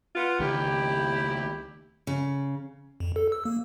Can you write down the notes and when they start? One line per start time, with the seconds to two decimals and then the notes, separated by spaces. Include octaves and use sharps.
0.15 B3 F4
0.40 C#2 D#3 E4 G4
2.07 C#3
3.00 F2
3.16 A4
3.32 E6
3.45 A#3